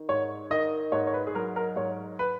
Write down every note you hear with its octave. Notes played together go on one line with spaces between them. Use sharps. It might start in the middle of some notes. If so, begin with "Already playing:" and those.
Already playing: D#3
G#2 C#5
D#3 D#5
G#2 C#5
C#5
B4
G#4
F#3 A#4
A#4
G#2 C#5
B4